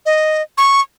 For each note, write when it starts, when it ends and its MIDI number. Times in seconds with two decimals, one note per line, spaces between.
0.06 0.42 75
0.58 0.81 85